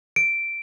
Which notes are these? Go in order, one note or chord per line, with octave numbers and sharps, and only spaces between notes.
D7